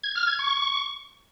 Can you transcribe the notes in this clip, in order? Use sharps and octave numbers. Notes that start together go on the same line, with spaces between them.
G#6
F6
G#6
C#6